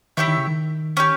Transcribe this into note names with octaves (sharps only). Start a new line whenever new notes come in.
D#3 E4 G4 C#5 E5
D#3
C#3
D#3
C#4 E4 G4